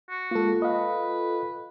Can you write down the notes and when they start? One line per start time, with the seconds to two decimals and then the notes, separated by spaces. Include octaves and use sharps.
0.10 F#4
0.31 G#3 A#3 F4 A4
0.62 B4 D#5 F5